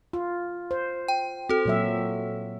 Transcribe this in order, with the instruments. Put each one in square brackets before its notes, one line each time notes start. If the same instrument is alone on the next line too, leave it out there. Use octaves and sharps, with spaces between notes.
[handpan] F4
C5
[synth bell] G5
[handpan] C4 [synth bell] F#4 A4
[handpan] A#2 F#3 E5